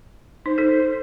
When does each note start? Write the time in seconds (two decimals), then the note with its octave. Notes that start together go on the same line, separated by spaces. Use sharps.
0.46 D#4 C5
0.58 D#4 A4